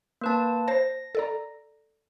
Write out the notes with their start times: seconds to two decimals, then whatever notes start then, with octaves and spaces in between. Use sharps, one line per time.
0.21 A#3 B4 A5
0.68 C5 A5 A#6
1.15 A4 D5 A#5